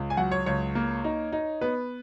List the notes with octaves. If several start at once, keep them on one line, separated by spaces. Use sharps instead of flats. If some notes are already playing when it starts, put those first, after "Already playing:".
Already playing: C#2
G#5
F#3 F#5
C#5
C#2 C#5
A#3
D#4
D#4
B3 B4